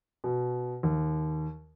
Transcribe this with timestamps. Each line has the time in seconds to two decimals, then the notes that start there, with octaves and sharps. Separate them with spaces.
0.24 B2
0.83 D#2